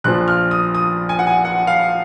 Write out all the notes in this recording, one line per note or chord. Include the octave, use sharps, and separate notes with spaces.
A#1 A#2 F3 F#6
F6
D#6
D#6
G#5
F#5
G#5
F#5
F5